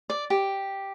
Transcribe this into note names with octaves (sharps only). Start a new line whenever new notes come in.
D5
G4